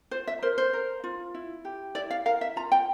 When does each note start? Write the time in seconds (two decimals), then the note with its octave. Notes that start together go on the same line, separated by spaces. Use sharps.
0.11 F4 C5
0.28 E5
0.42 A#4 C5
0.58 C5
0.73 A#4
1.04 F4
1.35 E4
1.65 G4
1.95 E4 D5
2.11 F5
2.26 A#4 F5
2.41 E5
2.56 F4 A#5
2.72 G5